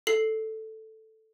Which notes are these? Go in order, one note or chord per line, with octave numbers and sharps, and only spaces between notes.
A4 C7